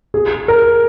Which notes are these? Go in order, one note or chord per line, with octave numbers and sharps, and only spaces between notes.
G#4
A#4